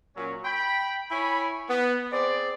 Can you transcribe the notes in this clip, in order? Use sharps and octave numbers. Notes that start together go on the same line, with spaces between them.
A#2 F#3 C#4
G5 B5
E4 C#5 G#5 B5
B3
C4 G#4 D5